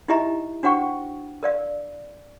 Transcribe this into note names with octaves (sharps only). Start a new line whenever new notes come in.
D#4 E4 G4 D#5 E5 A#5
D4 F#4 C5 F#5 G5 C#6
A#4 D5 F5